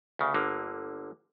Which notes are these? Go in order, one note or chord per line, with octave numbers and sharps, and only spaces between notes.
D2 C#3
G1 D3 A#3